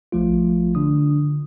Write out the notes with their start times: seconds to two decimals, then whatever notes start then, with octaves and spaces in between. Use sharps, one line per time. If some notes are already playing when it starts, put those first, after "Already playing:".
0.12 A#1 F3 A3 F4
0.75 D3 D4 D#6